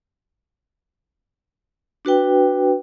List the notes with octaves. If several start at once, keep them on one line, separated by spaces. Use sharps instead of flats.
D4 F#4 B4 G5